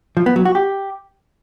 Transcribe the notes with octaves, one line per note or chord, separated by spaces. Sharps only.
F3
B3
F#3
F#4
G4